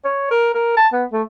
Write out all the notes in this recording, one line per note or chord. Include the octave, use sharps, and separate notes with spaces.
C#5
A#4
A#4
A5
B3
A3